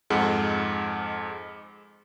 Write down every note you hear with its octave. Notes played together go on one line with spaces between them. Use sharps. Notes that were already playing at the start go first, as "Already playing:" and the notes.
F2 G#2 G#3 F#5